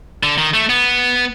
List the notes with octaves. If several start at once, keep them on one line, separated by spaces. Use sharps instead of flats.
D3
D#3
A3
B3